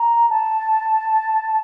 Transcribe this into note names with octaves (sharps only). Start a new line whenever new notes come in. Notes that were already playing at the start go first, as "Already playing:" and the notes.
Already playing: A#5
A5